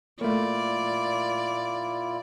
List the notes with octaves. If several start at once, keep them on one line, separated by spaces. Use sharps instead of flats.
A#2 A3 A#3 E4 F4 D5